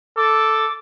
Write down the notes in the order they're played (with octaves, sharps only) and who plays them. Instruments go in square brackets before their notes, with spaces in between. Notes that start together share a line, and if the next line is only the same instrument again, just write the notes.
[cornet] A4 [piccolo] D6